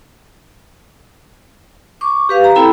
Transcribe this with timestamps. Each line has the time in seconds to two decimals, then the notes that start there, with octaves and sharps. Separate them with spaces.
2.01 C#6 D6
2.29 G4 B4 F5
2.44 A#5
2.55 C4 E4 A4 G5 B5